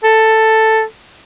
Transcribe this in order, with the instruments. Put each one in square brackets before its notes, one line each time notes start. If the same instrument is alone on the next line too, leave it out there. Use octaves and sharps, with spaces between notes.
[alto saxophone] A4